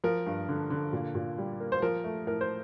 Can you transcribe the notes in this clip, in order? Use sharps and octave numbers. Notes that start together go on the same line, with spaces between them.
F3 A#4
G2
D3
D3
A#2
A#2
G3
A#3
C5
F3 A#4
A3
A2 A#4
C5